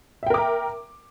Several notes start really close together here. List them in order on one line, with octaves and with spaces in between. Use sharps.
E5 G5 A#4 D6 A#5